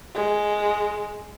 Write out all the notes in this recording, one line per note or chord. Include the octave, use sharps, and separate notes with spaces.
G#3